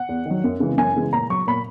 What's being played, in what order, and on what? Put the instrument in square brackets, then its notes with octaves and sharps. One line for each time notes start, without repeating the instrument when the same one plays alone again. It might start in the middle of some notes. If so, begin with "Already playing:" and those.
Already playing: [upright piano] F#5
E2
D#3 F#3
F#2
C#3 E3 G#3
F#2 G#5
C#3 E3 G#3
A#2 A#5
F#3 C#6
A#2 B5